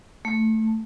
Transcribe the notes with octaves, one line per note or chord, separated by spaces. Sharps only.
A3